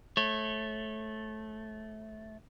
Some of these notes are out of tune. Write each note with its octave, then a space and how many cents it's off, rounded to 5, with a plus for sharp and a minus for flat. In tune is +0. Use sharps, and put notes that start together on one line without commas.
A3 -15 C#5 -30